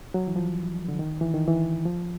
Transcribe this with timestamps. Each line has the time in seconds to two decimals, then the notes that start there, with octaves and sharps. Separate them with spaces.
0.14 F#3
0.27 E3
0.36 F3
0.88 D3
0.99 D#3
1.21 E3
1.34 D#3
1.48 E3
1.85 F3